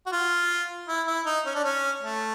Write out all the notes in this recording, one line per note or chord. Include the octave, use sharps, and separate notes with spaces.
F#4
F4
E4
E4
D#4
C#4
D4
C#4
A3